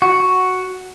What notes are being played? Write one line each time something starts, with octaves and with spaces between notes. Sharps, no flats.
F#4